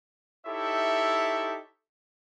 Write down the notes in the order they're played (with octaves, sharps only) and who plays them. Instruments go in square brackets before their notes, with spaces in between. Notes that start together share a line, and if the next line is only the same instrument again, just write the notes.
[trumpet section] D#4 E4 G4 A4 C#5 E5